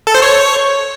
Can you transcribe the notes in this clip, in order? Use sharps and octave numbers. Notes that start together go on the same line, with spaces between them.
A4
C5
C#5